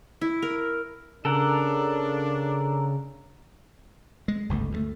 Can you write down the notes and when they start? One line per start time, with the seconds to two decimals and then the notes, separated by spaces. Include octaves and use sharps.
0.21 E4
0.42 A#4
1.25 C#3 D4 A4 A#4 F#5
4.28 G#3
4.49 G1 C#2 G#2 A3
4.72 D2 G3 A3